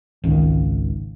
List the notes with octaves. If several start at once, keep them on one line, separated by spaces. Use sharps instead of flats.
G#1 C#2 D#3